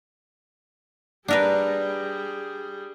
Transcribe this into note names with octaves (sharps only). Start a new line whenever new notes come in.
G3 D4 G#4 A#4 B4